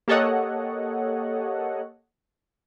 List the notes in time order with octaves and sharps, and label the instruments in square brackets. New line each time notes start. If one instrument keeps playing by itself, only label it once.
[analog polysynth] A#3 G4 A4 C#5 D#5 F#5